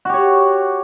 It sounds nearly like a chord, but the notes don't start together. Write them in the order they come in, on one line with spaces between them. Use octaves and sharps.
F#4 G4 C#5